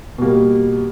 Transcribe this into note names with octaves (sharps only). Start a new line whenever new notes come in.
B2 G3 A#3